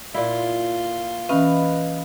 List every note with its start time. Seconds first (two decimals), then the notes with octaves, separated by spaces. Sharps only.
0.14 A#2 E4 F4
1.29 E3 C#4 B4 D#5 F5